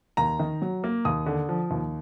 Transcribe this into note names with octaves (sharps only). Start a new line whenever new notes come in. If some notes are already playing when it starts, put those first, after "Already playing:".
D#2 A#5
D#3
F#3
A#3
D#2 D#6
D3
F3
D#2